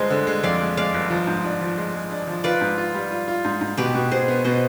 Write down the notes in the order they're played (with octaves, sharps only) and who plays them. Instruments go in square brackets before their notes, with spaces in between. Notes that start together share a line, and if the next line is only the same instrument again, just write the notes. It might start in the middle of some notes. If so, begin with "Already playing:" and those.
Already playing: [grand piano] G1 G#3 [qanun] C5 D#5
[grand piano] D3
G#3
[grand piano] F2 [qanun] D5 F5
[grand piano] G#3
[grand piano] G#3 [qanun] D5 F5
[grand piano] G1
F3
G#2
D4
F3
G#3
G#3
D4
F3
[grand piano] F4 [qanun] B4 D5
[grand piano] G#2
F4
G3
F4
F4
G#2
G#2
[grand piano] B2 [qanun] G4 B4
[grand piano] B2
[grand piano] B2 [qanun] G#4 C5
[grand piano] B3
[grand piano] B2 [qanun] C5 D#5